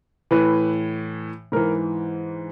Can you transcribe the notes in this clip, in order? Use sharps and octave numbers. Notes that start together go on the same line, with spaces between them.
A2 E3 B4
G#2 E3 A#4